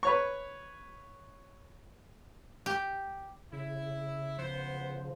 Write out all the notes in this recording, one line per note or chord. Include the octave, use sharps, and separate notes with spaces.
B4 C#5 C#6
G4
C#3 E4
C#3 F3 B3 C5